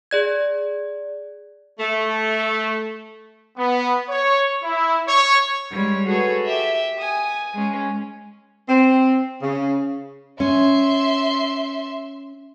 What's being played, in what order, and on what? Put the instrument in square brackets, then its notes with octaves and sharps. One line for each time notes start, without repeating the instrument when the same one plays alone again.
[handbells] G#4 D5 G#6
[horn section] A3
[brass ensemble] B3
C#5
E4
C#5
[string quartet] G3 G#3 C#5
F#4 G#4 A4 B4 C#5
G4 E5
G#5 D#6
G#3 C#4
[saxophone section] C4
C#3
[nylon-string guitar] C#4 [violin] E5 C6